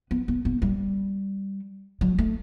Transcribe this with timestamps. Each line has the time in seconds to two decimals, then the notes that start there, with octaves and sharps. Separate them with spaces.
0.11 B3
0.28 B3
0.45 B3
0.62 G3
2.01 F#3
2.18 A3